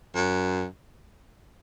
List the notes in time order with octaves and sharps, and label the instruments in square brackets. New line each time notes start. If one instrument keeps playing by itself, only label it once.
[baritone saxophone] F#2